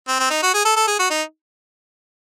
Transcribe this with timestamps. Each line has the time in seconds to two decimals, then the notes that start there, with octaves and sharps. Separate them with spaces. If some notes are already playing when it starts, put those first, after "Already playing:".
0.08 C4
0.20 C4
0.30 D#4
0.43 F#4
0.54 G#4
0.65 A4
0.76 A4
0.88 G#4
0.99 F#4
1.10 D#4